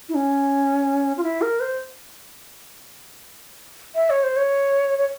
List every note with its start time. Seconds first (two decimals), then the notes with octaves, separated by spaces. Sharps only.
0.09 E4
0.15 C#4
1.17 F4
1.23 E4
1.42 A#4
1.60 C5
3.95 E5
4.10 C#5
4.23 C5
4.37 C#5
4.99 C#5